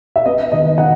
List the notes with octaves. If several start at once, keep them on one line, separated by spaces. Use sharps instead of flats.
E5
B3 D#5
D#3 D#5
D#3 F#5